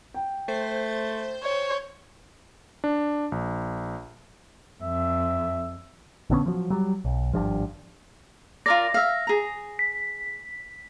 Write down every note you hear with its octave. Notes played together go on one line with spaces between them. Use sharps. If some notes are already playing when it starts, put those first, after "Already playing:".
G5
A3 C5
C#5
D4
A#1
F2 E5
A#1 D3 B3 C#4
F3 F#3
F#3 G3
B1
G#1 G2 F3
F4 A#4 D5 A#6
E5 F5
G#4 A#5
B6